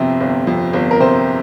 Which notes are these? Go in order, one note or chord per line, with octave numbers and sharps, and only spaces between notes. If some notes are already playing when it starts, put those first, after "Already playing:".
Already playing: G1 F2 C3
G1
F2
G1
A#4
C3 C5